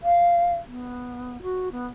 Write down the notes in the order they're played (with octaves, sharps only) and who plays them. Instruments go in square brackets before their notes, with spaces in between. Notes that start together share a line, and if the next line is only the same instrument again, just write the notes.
[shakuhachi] F5
B3
F#4
B3